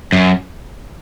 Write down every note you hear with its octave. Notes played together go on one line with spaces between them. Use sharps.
F#2